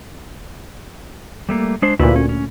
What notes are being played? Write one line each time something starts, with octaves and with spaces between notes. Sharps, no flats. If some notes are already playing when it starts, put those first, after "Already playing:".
G3 A3 A#3
G#3 D4 C5
D2 A#2 E4 B4
C#4
C#4